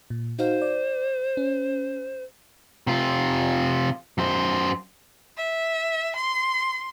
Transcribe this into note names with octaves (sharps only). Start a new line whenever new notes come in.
A#2
D#4 F#4 C5 F5
D5
C#4
C3 F4
F#2 C5
E5
C6